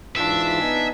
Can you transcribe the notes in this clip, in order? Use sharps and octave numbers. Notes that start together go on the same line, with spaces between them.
G#2 E3 D4 F4 E5
B3 D#4 G#5